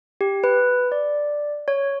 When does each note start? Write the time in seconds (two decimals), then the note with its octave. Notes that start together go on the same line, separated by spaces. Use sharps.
0.21 G4
0.44 B4
0.92 D5
1.68 C#5